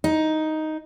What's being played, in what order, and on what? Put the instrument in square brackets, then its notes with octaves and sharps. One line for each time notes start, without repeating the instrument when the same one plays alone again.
[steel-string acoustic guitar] D#4